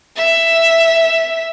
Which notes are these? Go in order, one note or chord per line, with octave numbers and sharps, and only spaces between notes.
E5